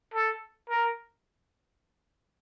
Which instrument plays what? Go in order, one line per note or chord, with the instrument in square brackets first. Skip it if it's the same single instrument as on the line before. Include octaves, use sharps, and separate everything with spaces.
[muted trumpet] A4
A#4